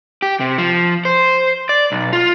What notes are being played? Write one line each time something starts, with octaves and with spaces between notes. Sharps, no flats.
G4
C3
F3
C5
D5
B1
F4